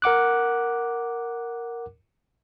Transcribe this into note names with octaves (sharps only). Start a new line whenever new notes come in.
A#4 F#5 D6 F#6